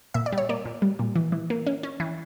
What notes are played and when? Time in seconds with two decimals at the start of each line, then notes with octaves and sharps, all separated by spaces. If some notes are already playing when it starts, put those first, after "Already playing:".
0.14 A#2 E5
0.26 D5
0.32 G3
0.38 C#5
0.49 A#3 D5
0.66 A#2
0.82 G3
0.99 A#2
1.16 E3
1.32 E3
1.50 A#3
1.67 C#4
1.83 C#4
2.00 E3